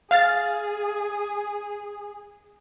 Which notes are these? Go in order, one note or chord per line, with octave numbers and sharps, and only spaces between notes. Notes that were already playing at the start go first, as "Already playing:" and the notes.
G#4 F5 F6 A6